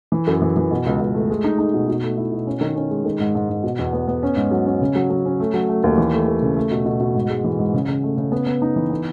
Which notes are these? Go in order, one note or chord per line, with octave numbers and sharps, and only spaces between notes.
E3
F#2
E3
E3
B2
C#2
C#2
A3
G#3
D#4
D#4
B2
B2
A3
E4
B2
C#4
D#3
C#4
G#3
D#3
G#2
G#2
G#2
B2
E2
B3
B3
C#4
G#2
F#3
C#4
C#3
F#3
F#3
C#4
A3
F#3
A3
D#2
E3
A3
D#2
C#3
A3
B2
B2
B2
G#2
G#3
E3
G#2
C#3
C#3
A3
C#3
B3
B3
D#4
E3
B3